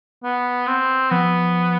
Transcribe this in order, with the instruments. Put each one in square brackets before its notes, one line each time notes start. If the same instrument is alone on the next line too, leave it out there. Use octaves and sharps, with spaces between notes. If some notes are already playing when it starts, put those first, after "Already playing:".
[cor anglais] B3
C4
[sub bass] F3 [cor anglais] B3